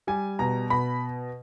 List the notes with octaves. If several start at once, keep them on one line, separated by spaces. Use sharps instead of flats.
G3 G#5
B2 A#5
B2 B5